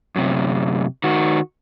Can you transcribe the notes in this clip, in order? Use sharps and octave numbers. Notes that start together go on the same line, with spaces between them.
F#2 C3
D#3 F#4